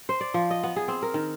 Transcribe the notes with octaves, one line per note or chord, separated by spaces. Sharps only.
C5
D5
F3
D#5
B3
G#4
C4
A#4
D#3